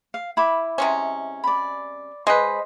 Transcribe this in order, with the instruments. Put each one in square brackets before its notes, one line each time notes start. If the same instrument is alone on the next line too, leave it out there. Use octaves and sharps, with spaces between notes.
[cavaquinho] F5
E4 B5 D6
[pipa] C3 G#3 C#4
[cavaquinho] D5 B5
[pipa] G#3 G#4 B4 [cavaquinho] C5 D#5